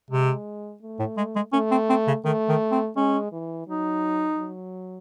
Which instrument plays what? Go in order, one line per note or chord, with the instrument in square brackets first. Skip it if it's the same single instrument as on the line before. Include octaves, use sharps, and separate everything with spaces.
[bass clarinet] C3 [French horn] G#3
[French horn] A3
[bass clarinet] A2
G#3
G#3
[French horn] A3 [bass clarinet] C#4
[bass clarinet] C4
C4
C#3
[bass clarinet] D#3 [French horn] A3
[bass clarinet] D#3
C4
[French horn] G#3 [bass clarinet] C#4
[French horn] E3
[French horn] F#3 [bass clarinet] D#4
[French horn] F#3